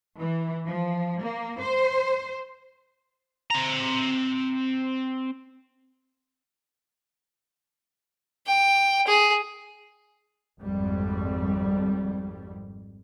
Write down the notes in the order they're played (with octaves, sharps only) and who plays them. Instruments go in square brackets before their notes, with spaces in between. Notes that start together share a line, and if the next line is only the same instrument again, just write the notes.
[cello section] E3
F3
A#3
C5
[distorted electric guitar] C4 A#5
[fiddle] G5
G#4
[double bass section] G#1 F2 G3